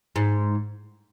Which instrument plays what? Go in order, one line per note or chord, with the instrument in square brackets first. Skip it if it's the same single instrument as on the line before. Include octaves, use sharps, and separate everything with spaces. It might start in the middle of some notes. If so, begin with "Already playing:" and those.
[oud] G#2